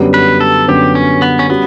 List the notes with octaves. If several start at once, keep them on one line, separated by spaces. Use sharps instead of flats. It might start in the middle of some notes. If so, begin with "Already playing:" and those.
Already playing: F#2 D3 G3 B3
B4
A4
F#2 D3 G3 B3 G4
C#4
B3
C#4
G3 B3 C#4 F#4